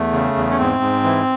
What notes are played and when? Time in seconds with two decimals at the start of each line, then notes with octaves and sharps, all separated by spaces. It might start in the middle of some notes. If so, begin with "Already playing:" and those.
Already playing: E2 A3
0.13 C#3
0.35 E2
0.50 C#4
0.58 G#2 C4
0.80 G#2
1.04 E3